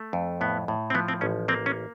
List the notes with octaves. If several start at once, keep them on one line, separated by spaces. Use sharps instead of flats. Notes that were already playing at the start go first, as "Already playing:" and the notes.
Already playing: A3
F2
A2 B3
A2
C4
F3 B3
C4
A1 C#4
A#3 C4
C#4